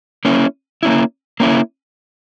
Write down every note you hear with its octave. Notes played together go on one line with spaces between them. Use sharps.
A#3 C#4 E4
A#3 C#4 E4
A#3 C#4 E4